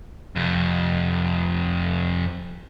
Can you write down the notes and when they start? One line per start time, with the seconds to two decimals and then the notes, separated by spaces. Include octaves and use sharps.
0.36 F2 C3